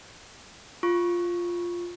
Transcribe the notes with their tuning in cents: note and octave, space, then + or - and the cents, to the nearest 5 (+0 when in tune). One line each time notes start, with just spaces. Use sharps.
F4 +0 C#6 -5